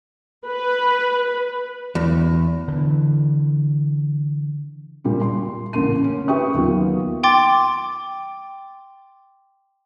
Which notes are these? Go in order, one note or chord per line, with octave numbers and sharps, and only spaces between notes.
B4
E2
D3 E3
A#2 G3 F4
C6
A1 C#3 A#3 C6 D#7
C#4
G4 B4 E5 G5 C#6 D#6
D#2 F#3 A#3 B3 F4
G5 C6 D6 A6